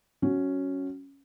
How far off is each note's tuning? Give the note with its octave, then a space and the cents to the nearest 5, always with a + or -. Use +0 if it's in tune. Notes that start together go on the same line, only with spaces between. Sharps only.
F#3 +0 C#4 +0